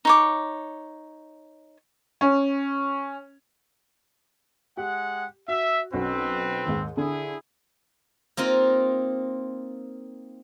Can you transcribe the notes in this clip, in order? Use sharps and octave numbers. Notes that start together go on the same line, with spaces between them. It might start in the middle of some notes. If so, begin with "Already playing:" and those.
D#4 C#5 D6
C#4
G#3 G4 F#5
F#4 E5
B1 C4 C#4 F#4 B4
D#2 G#2
D3 E4 G#4
A#3 C4 D#4 F4